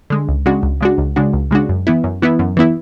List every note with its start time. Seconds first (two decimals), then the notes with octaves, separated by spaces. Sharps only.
0.10 D3 G#3
0.29 C#2
0.46 C#3 G#3 D4 F#4
0.63 C#2
0.81 C#3 G#3 D4 F#4
0.98 C#2
1.16 C#3 G#3 D4 F#4
1.34 C#2
1.51 C#3 G#3 D4 F#4
1.69 F#2
1.87 E3 B3 E4
2.04 F#2
2.22 E3 B3 E4
2.39 F#2
2.57 E3 B3 E4